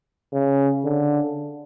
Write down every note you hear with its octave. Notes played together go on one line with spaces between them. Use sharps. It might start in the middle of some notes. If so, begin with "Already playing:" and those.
C#3
D3